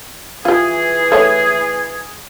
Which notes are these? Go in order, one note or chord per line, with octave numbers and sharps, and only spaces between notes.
E3 F4 G4 G#4
A3 C#5 F#5